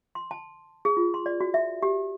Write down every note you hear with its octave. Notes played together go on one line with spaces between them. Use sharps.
C6
A5
G#4
F4
C6
D5
F#4
E5
G4